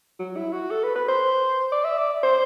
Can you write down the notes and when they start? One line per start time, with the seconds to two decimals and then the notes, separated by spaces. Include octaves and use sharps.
0.19 F#3
0.37 E4
0.53 F#4
0.71 A4
0.84 B4
0.96 B4
1.08 C5
1.72 D5
1.85 E5
1.98 D5
2.24 C5